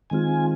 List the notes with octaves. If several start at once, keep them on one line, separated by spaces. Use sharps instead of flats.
D#3 G#3 C4 F4 G#5